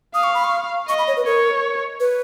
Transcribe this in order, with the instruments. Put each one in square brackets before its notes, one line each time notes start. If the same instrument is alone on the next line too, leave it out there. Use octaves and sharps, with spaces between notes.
[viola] F5 [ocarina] D#6
[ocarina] C#6
B5
C#6
[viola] D#5 [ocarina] C#6
[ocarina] B5
C#5
B4
[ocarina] A#4 [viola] C#5
[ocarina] B4